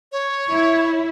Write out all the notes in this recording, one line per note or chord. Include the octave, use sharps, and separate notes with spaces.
C#5
E4